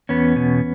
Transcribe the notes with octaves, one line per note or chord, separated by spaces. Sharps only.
E2 B3 C#4
B2